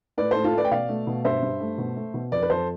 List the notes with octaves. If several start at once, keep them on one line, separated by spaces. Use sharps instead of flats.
A2 B4 D5
A2 A4 C5
F4 A4
A3 B4 D5
G5
B2 D5 F5
A3
B2
G2 C5 E5
G2
A3
B2
A3
B2
F2 B4 D5
B4
F2 A4 C5